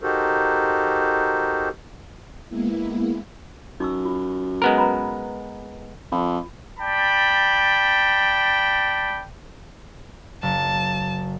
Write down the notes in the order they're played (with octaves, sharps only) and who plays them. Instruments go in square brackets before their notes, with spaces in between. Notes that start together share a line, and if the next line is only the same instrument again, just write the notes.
[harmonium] D#4 F#4 G4 A4 A#4 C5
[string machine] G#3 A#3 B3 E4
[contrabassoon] F#2 [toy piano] D#4 C#6 E6
[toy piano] F4
[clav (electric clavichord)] G#3 B3 A#4
[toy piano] B4 A#5 B5
[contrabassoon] F2 [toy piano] F4
[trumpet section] D5 G5 A5 B5
[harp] F#1 [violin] A5